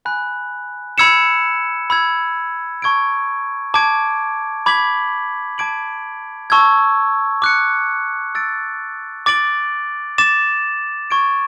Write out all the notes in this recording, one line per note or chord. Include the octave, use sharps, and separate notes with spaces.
G#5 B5 F#6
B5 E6 G#6 C#7 E7
B5 E6 G#6
A5 C#6 G#6 D7
A5 D6 G#6 D7
B5 D6 G#6 B6 F#7
A5 D6 G#6 D7 F#7
A5 C#6 E6 G#6
D6 F#6 C#7
E6 A6 D7
D6 A6 D7 F#7
D6 A6 E7
C#6 G#6 D7